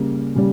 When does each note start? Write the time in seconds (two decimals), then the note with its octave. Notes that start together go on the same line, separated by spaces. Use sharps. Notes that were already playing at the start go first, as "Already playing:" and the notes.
Already playing: C#3 G3 A#3
0.36 C#3 G3